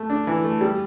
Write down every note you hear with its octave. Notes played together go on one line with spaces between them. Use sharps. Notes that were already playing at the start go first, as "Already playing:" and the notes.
Already playing: A3
D4
E3
A3
G3